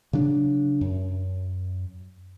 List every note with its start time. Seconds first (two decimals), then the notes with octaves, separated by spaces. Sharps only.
0.13 C#3 F#3 D4
0.81 F#2